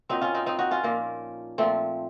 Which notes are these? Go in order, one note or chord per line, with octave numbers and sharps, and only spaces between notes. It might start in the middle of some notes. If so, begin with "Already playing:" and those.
A#2 F#3 C4 D#4
C#4 F4
C4 D#4
C4 D#4
D#4 F#4
C#4 F4
A#2 F3 A#3
A#2 F3 A3 C4